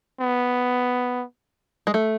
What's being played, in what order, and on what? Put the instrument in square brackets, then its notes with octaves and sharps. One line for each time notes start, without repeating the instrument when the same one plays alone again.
[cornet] B3
[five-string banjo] G#3
A3